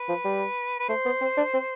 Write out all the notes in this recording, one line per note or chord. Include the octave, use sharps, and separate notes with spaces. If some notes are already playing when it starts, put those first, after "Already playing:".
Already playing: B4
F3
G3
B4
A3 C5
B3
C4
D4
C4